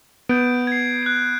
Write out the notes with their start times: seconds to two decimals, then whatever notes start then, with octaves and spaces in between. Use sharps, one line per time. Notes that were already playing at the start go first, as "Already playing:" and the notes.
0.29 B3 G6 D7
0.67 G#6 C7
1.03 F#6 D7